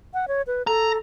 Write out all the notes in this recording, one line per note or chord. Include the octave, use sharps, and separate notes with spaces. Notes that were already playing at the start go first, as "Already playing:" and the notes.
F#5
C#5
B4
A4 A#5